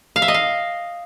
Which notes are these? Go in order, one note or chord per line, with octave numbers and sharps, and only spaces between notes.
F5
E5
D#5
F5